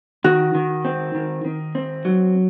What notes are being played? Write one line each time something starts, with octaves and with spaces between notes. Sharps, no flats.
D#3 F#4
D#3
C4
D#3
D#3
C4
F#3